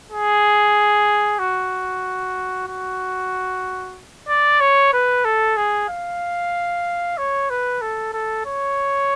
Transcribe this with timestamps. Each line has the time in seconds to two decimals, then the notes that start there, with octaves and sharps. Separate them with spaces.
0.11 G#4
1.39 F#4
2.67 F#4
4.28 D5
4.61 C#5
4.93 B4
5.25 A4
5.57 G#4
5.89 F5
7.18 C#5
7.50 B4
7.81 A4
8.13 A4
8.46 C#5